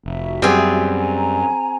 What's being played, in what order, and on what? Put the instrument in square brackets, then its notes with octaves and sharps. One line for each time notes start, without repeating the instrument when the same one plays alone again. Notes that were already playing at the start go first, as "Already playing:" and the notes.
[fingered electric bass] F1 [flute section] F#4 E5
[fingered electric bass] F#2 [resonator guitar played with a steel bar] G3 B3 [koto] C4 G#4
[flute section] G#5 A#5